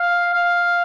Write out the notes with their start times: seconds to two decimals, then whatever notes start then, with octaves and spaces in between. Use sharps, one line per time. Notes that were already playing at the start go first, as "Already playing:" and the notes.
Already playing: F5
0.33 F5